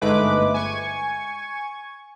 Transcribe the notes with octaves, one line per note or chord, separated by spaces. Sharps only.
G1 G#2 G#3 A3 B4 D6
G#5 C#6 G#6